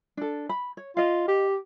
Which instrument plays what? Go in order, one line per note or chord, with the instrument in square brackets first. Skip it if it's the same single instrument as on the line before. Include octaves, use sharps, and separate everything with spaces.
[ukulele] D4 A4
B5
C#5
[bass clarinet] F4 [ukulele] D#5 F5
[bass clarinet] G4